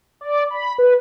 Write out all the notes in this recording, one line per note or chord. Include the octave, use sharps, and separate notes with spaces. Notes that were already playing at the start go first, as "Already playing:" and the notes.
D5
B5
B4